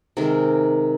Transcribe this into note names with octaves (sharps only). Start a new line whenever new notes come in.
C3 D#3 G#3 A#4